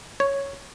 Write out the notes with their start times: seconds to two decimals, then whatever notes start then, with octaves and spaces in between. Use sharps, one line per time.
0.20 C#5